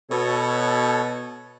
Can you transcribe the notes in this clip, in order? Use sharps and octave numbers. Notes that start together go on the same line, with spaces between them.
B2 A4 C#5